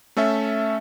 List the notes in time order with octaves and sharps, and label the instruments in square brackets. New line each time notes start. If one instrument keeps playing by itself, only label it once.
[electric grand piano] A3 C#4 A4 E5